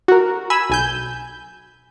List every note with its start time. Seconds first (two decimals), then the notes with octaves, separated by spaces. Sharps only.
0.08 F#4 A#4
0.50 G#5 B5 E6
0.70 B1 G#5 G6